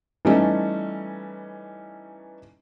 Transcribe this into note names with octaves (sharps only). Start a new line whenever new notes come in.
E3 G3 A3 C#4 D#4